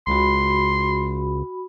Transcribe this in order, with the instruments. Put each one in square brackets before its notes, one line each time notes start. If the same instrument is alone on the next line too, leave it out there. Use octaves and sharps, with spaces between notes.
[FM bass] C#2 [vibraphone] F#4 B5 [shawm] C6